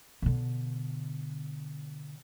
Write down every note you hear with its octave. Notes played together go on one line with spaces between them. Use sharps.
B2 D3